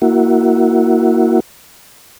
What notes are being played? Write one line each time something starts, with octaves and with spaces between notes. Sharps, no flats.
A#3 E4 F#4